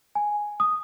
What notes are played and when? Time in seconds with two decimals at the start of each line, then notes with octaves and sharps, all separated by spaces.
0.15 G#5
0.60 D#6